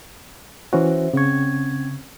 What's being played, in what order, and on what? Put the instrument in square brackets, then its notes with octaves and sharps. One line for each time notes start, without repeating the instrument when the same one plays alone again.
[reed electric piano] E3 C#4 F#4 [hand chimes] C5 E5
[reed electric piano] C#3 C#6 [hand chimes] C4 C#4 G#6